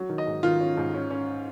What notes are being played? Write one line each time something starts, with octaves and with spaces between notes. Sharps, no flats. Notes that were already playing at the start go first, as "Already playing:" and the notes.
Already playing: F#3
D#3
D#5
G#2
D#3 F4
C#4
G#2
C#4
C#4